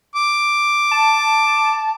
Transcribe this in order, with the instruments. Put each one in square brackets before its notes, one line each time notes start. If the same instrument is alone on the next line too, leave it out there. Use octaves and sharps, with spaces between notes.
[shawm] D6
[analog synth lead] A5